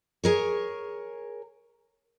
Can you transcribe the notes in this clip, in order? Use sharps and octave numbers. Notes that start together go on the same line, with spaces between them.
G#4 A#4 C#5